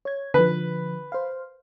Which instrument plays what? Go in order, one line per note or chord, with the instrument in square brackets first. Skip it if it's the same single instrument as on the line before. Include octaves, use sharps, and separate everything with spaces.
[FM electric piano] C#5 G#6
[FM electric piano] D3 F3 [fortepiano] B4
[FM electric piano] C5 F5